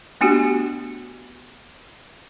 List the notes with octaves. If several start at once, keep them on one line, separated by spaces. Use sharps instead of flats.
A3 B3 D4 F#4 G4